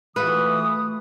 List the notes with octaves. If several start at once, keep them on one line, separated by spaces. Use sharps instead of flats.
E3 A3 F4 F#4 B4 D#6